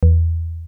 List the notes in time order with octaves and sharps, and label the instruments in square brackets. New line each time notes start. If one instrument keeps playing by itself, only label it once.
[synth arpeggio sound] E2